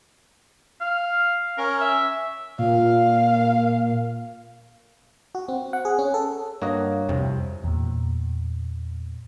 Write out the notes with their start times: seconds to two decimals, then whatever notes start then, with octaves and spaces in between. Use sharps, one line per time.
0.81 F5
1.58 C#4 A#4
1.81 E5
2.59 A#2 F5
5.35 F#4
5.48 C4
5.73 F#5
5.85 G#4
5.99 C#4
6.14 A4
6.62 G2 A#3 F#4 C#5 D#5
7.09 C2 F2 C3
7.64 E2 A#2